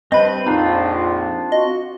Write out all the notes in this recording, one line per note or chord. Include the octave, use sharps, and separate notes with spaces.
G2 C4 B4 D#5 B5
A#1 F2 C4 D4 D#4 F4
F#4 D#5